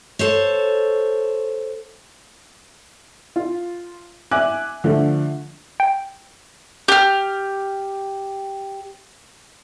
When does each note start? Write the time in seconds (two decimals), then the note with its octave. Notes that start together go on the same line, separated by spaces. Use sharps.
0.19 A4 C5 C#5
3.36 F4
4.31 E5 G#5 D6 F#6
4.84 D3 F3 A3
5.80 G5
6.88 G4 F6